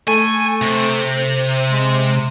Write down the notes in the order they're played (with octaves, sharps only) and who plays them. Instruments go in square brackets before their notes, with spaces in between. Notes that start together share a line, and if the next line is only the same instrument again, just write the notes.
[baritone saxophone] A3 [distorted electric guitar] G#5
[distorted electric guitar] C3
[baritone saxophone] G#3